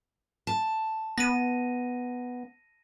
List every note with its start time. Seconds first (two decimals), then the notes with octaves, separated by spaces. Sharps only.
0.47 A5
1.18 B3 A#6 D#7